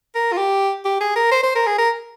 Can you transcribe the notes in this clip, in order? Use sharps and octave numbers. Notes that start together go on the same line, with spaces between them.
A#4
F4
G4
G4
G#4
A#4
C5
C5
A#4
G#4
A#4